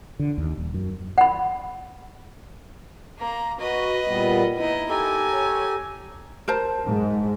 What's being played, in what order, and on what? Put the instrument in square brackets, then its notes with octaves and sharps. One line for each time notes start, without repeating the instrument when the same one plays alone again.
[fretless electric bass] D3
D#2
D#1
F#2
[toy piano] F#5 B5
[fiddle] A#3 A#5
[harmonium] F#4 [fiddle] B4 D#5
[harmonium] A#2 G3 B3
[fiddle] B3 D#5 [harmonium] D#4 E4
[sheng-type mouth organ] G4 A4 [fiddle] A#4 G#5
[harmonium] C#5
[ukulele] A#4 C5 A5
[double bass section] G#2